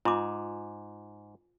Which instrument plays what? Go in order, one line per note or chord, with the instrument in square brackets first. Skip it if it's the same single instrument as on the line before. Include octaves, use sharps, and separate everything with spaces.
[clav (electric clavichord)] G#2 [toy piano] F4 D6